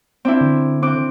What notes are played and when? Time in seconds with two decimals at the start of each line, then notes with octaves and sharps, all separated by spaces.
0.25 C4 D4 E4
0.41 D3
0.82 C4 D6 F#6